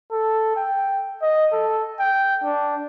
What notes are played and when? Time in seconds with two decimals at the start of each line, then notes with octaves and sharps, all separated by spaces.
0.12 A4
0.57 G5
1.22 D#5
1.52 A4
2.00 G5
2.44 D4